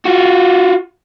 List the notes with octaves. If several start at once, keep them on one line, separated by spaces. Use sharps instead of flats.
F4 F#4